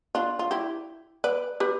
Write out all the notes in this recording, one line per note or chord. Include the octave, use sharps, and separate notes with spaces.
D4 F4
F4
E4 G4
B4 D5
G4 B4